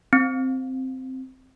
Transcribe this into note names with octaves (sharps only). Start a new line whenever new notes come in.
C4